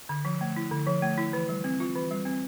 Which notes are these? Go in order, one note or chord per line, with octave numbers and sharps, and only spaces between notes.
D3
F3
A3
E4
D3
F3
A3
E4
E3
G3
C4
F4
E3
G3
C4